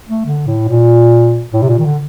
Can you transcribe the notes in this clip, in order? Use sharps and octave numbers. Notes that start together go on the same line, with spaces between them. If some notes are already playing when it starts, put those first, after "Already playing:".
A3
D3
A2
A#2
A2
C3
A#2
D#3
D3